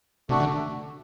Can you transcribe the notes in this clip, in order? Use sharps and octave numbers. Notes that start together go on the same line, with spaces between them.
C3 A3 D4 F#4
D3